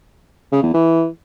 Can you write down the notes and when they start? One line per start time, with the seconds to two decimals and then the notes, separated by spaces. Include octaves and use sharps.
0.52 C#3
0.63 E2
0.74 E3